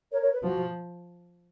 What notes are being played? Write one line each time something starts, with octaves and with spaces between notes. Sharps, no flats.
A#4 C#5
A#4 C#5
B4
F3 F#4